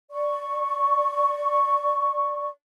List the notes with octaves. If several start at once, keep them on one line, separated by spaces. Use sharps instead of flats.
D5 C#6